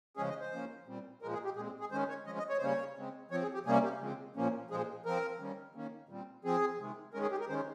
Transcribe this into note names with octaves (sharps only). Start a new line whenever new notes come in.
C#3 F3 G#3 C#4 G#4
D#5
C5
F3 A#3 C#4
A#2 G3 C4
A#2 F3 G#3 A#4
G#4
G4
A#2 G#3 C4 G#4
G#4
D#3 G#3 C#4 C5
C#5
F3 G#3 C#4 D#5
D#5
C#5
C5
C#3 G3 A#3 C#4 C#5
C#3 G#3 C4
F3 C4 C#5
G#4
G4
C3 G3 A#3 C#4 G#4
G4
C#3 F3 G#3 C4
A#2 F3 A#3 C#4
A#2 F3 G#3 G#4
F3 C4 A#4
D#3 G3 A#3 C#4
D#3 A#3 C#4
A#2 G3 C4
F3 C4 G#4
C3 D#3 G#3
D#3 G#3 C#4 A#4
G#4
G4
A#4
D#3 G#3 C#4 C5